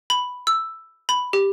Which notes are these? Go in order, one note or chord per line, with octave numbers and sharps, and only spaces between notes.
B5
E6
B5
G4